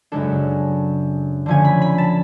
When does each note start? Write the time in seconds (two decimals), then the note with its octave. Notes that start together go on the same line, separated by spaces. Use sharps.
0.12 F#2 C#3 G#3 D4 A4
1.46 D3 F3 A3 C#4 G#5
1.64 B5
1.82 B5
1.98 A5